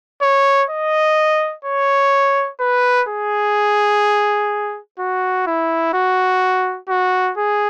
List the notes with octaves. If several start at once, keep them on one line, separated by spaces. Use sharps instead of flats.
C#5
D#5
C#5
B4
G#4
F#4
E4
F#4
F#4
G#4